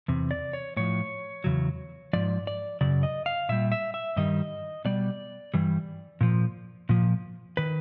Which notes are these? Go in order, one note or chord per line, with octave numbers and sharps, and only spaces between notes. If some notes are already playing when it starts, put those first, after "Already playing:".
E2 C3
D5
C#5
A2 F3 C#5
E2 C#3 F#3
G#2 F3 D5
D5
F#2 C#3 D5
D#5
F5
A#2 G3 E5
E5
E5
G2 D#3 G3 D#5
B2 G3 D5
G2 E3 G3
A#2 F3
A#2 F3
D#3 B4